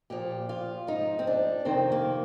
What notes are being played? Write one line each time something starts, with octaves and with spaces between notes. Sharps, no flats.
A#2 F3 G4
F4
G#2 F3 D#4
C4
D4
F2 C3 D#3 C4
A#3